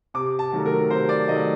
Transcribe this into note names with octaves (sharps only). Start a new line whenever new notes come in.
C3 D6
A5
D#3 F#3 A3
A#4
C3 C5
D5
D#3 F#3 A3 D#5